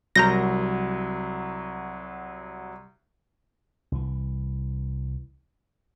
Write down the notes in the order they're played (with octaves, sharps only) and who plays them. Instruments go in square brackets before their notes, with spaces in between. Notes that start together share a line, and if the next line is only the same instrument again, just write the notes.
[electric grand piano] C2 F#3 [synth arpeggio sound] A#4 G6 A#6
[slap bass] C2 E3